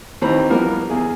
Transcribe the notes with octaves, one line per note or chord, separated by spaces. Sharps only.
D#2 E3 C4 C5 A#5 B5
E3 F3 G3 A#3 B3 A#4
E2 G#4